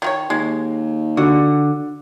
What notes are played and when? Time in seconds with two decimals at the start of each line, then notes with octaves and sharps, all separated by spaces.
0.02 D#3 F4 C#5
0.30 D#2 G#3
1.17 D3 F#4